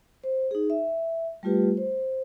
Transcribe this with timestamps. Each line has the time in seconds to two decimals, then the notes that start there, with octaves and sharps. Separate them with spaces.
0.24 C5
0.51 D#4 G#4
0.70 E5
1.43 G3 A3 F4 G4 B4
1.77 C5